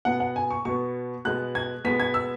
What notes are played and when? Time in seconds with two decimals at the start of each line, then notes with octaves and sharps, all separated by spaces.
0.05 B2 B3 F#5
0.20 F#5
0.36 G#5
0.51 C#6
0.65 B2 B3 C#6
1.25 B2 G#3 B3 F#6
1.55 G#6
1.85 B2 G#3 B3 B6
2.00 G#6
2.14 E6